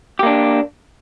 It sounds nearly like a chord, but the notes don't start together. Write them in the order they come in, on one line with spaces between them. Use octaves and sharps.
G4 A#3 D4